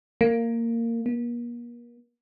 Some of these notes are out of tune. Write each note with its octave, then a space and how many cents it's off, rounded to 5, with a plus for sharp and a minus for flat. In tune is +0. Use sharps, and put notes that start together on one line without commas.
A#3 -15
A#3 +40